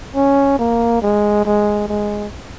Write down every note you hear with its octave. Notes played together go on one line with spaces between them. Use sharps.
C#4
A#3
G#3
G#3
G#3